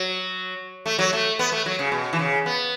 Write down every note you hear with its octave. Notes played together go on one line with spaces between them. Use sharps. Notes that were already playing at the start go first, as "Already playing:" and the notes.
Already playing: F#3
A3
F#3
A3
B3
A3
F#3
C#3
B2
E3
C#3
B3